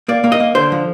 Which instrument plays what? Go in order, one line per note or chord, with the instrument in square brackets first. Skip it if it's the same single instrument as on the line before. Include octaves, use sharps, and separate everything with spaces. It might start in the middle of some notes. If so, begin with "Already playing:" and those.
[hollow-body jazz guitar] A#3 D5
A#3
D#5
A#3
D3 C5
F3